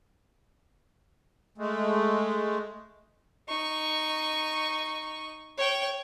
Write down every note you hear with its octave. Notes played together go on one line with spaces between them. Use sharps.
G#3 A3
D#4 C#6
C#5 G5